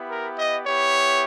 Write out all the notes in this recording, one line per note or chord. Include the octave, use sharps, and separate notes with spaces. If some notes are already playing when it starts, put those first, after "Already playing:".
Already playing: B3 E4 G4
A#4
D#5
B3 E4 G4 C#5